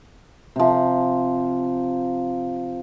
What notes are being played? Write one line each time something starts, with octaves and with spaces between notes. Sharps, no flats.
C3 F3